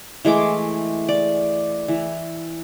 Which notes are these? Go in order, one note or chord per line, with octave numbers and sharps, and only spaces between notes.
E3 G#3 A3 D6
D5
E3